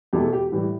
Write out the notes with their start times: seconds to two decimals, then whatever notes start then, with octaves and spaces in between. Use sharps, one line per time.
0.13 E2 B2 A3 G4
0.23 A4
0.33 G4
0.52 A2 E3 G3